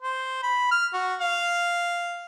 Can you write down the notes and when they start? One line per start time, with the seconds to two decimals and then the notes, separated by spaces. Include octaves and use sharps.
0.02 C5
0.43 B5
0.71 F6
0.93 F#4
1.20 F5